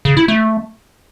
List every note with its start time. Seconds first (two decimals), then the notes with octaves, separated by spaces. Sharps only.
0.05 C#3
0.17 E4
0.28 A3